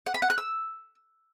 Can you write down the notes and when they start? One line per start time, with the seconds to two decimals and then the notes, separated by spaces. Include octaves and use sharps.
0.06 F#5
0.14 B5
0.22 F#5
0.30 F#6
0.38 E6